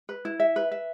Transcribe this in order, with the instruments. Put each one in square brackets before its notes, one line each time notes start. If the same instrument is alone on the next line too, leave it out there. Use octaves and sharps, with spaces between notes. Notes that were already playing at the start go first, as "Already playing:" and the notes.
[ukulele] B4
E4
E5
B4
E5